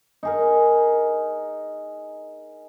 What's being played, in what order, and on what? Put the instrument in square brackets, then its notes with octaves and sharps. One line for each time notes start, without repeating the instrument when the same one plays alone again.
[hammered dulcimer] D#4 G#4 A#4